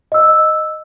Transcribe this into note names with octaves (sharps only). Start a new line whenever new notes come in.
D#5 E6